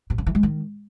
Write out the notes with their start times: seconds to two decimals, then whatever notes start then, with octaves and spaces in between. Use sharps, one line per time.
0.10 B2
0.18 C#3
0.27 E3
0.35 G#3
0.43 D#3